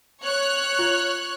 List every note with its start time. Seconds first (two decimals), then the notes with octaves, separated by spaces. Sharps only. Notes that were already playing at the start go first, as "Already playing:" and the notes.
0.24 C#5 F6 F#6
0.79 F4